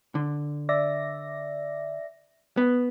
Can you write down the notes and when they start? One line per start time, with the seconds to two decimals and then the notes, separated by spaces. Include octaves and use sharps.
0.15 D3
0.69 D5 E5 A#6
2.57 B3